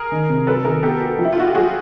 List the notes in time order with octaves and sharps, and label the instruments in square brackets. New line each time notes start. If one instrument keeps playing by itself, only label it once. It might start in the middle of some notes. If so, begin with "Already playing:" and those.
Already playing: [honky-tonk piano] G#4 A#4
[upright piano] D#3
C3
[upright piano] F#3 [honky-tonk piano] A4 B4
[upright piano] D#3 [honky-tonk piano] G#4 A#4
[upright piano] B3 [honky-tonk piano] G4 A4
[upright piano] F#4
F3
[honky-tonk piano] E4
F4
[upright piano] D#4 [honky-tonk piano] F#4
[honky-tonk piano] G4
[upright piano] F#3 [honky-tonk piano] F#4 G#4